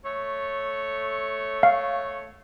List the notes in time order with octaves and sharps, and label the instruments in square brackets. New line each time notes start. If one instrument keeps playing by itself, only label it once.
[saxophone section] A3 C#5
[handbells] F5